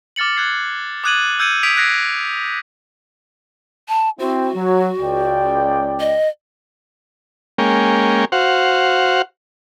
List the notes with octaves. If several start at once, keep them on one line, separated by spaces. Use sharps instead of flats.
D6 F6 A6 C#7 F#7
F#6 G#6 C7
D6 D#6 F#6 G#6 D#7 F#7
E6 G6 G#6 C#7 D#7 F#7
D#6 G#6 B6 D7 F7
F#6 G#6 A#6 C7 D7
A5
C4 E4 F#4
F#3
C#2 D5 G5
D#5
G#3 A#3 C#4 G5
F#4 C5 F5 F#5